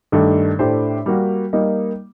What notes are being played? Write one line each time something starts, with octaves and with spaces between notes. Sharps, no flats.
G2 D#3 A3 D4
A2 A3 D4 G4 C5
G3 A#3 F#4
G3 A#3 D#4